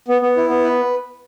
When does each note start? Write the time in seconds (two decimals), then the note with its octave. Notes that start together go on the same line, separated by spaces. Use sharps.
0.08 B3
0.22 B3
0.37 E4
0.50 B3
0.64 B4